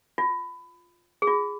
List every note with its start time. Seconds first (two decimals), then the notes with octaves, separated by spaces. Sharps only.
0.18 F4
1.22 G#4
1.27 F4